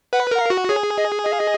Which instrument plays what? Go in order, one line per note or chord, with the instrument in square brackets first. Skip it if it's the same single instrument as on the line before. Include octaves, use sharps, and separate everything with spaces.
[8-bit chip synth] B4 [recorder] F#5
[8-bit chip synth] A#4 [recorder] F#5
[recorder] F5
[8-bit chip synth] F#4
[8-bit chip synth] G#4 [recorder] C#5
[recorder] D#5
D#5
F5
D#5